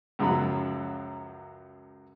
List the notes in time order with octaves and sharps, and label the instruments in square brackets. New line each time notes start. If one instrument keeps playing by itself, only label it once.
[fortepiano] C#2 F#2 F3 F#3 B5